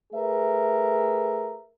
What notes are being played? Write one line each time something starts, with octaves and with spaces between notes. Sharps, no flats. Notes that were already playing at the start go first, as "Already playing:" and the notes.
A3 G#4 A#4 B4 E5